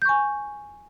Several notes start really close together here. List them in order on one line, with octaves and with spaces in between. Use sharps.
G6 C#6 G#5